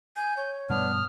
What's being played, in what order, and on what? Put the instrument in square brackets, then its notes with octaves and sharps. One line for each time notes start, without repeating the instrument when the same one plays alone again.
[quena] G#5 [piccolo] G6
[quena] C#5
[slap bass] G2 B2 G3 [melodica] B3 D4 [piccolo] F6
[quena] D#6